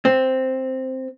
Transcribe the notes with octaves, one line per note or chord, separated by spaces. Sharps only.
C4